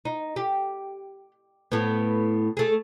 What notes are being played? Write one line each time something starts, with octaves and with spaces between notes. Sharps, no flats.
D#4
G4
A2 B3
A3 G#4